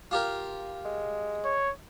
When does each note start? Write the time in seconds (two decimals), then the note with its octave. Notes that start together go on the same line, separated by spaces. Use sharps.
0.11 F4 G4 A#4
0.85 G#3
1.45 C#5